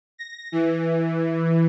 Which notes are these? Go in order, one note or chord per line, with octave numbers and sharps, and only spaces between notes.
A#6
E3